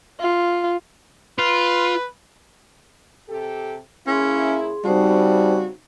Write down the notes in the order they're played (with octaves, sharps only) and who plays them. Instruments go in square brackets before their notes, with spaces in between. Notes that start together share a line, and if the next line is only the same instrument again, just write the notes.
[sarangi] F4
[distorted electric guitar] F4 [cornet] B4
[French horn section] C3 G4 A4
[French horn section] C#3 A#3 E4 [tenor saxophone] C#4 [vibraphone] G#4 C6
[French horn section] C#3 C4 [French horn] G3 [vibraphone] D#4 C5 A5 [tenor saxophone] F#4